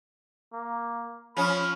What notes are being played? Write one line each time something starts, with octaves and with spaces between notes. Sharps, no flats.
A#3
F3 C#4 B5